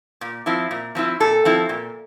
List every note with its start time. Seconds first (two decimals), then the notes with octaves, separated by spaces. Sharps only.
0.21 A#2
0.46 F3 C4 E4
0.71 A#2
0.95 F3 C4 E4
1.20 A#2 A4
1.45 F3 C4 E4
1.69 A#2